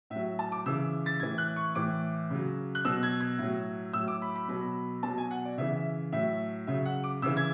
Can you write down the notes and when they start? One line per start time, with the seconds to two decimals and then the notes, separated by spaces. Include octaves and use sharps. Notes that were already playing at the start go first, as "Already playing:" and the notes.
0.10 A2 E5
0.16 F#3
0.39 A5
0.52 D6
0.66 C#3 E3 E6
1.06 A6
1.20 A2 E3 G#6
1.38 F#6
1.56 C#6
1.75 A2 E3 D6
2.30 C#3 F#3
2.75 F#6
2.85 B2 F#3 E6
3.03 G#6
3.21 G#6
3.39 A2 F#3
3.93 A2 F#3 E6
4.08 D6
4.22 B5
4.36 B5
4.48 B2 F#3 B5
5.03 B2 F#3 A5
5.18 G#5
5.31 F#5
5.45 D5
5.58 C#3 E3 E5
5.76 E5
6.12 A2 F#3 E5
6.67 C#3 F#3 E5
6.86 F#5
7.04 D6
7.22 C#3 E3 E6
7.37 G#6